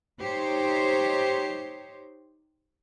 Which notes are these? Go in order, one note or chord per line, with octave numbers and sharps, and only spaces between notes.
D#4 G4 C5 C#5